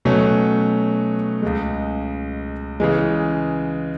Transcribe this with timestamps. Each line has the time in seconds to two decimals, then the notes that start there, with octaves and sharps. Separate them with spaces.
0.05 B2 F#3 A3 C#4
1.42 C#2 C#3 G#3
2.80 C#3 E3 G#3